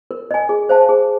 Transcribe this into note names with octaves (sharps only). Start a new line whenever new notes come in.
A#4
D#5 G#5
G#4
C5 F5 A5
G#4